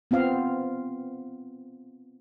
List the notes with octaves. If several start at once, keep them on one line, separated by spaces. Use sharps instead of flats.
B3 C4 F4 F5